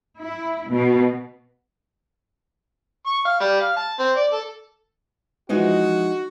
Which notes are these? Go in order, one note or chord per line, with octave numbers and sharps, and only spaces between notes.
E4
B2
C#6
F5
G3
F5
A5
C4
D5
A4
E3 F3 G#3 D#4 F#4 D#5